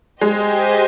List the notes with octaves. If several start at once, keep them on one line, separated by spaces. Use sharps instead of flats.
G#3 G4 C5 D#5 G#5